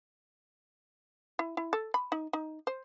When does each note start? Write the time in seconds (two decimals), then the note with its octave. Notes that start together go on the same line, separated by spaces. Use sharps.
1.39 E4
1.57 E4
1.73 A4
1.94 B5
2.12 D#4
2.33 D#4
2.67 C5